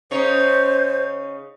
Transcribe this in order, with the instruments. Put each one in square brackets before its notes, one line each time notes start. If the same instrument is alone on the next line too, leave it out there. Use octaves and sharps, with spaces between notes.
[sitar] C#3 D#4 C#5 [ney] C5